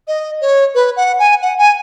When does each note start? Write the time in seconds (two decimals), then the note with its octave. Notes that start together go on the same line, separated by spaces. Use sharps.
0.08 D#5
0.41 C#5
0.75 B4
0.97 F#5
1.19 G#5
1.42 F#5
1.58 G#5